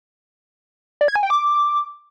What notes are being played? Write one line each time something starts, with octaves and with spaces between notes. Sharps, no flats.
D5
G#6
G#5
G5
D6